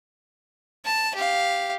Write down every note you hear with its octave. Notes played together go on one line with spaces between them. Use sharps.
A5
G4 F5